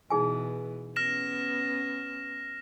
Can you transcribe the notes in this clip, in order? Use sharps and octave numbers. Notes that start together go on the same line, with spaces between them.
B2 E3 D#4 G#4 G#5
B3 C#4 F6 A#6 E7